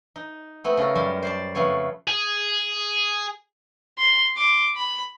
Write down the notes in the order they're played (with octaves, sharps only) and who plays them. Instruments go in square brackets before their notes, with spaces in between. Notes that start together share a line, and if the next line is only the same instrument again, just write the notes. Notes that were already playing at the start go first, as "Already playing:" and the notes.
[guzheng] D#4
A3 B3 C4
C#3 C#4 A4 A#4
F#2 G3 G#3
C5 D5 A5
F2 C#3 A3 B3 C#5
[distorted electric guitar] G#4
[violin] C6
C6 D6
B5